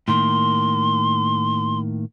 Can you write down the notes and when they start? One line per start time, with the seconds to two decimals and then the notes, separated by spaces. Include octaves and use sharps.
0.08 A2 D#3 A#3 C6